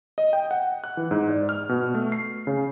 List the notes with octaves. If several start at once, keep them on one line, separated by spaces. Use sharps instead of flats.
D#5
G5
F#5
F#6
E3
G#2
D5
F6
B2
A3
C7
C#3